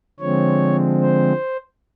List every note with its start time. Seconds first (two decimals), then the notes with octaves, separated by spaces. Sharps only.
0.20 D3 F3 G#3 C4 C#5
1.00 C5